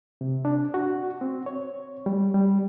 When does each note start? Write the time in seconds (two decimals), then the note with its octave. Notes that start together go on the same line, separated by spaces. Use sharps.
0.21 C3
0.45 D4
0.74 F#4
1.21 C4
1.46 C#5
2.06 G3
2.34 G3